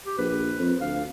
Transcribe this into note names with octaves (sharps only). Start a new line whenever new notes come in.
G4
A#1 B4
F2
D2 F5